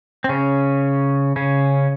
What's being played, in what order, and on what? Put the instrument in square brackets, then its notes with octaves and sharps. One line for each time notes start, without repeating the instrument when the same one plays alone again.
[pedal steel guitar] C4
C#3 C#4
C#3 C#4